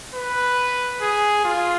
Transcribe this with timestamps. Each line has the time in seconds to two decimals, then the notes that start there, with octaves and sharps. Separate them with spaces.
0.14 B4
1.01 G#4
1.44 F4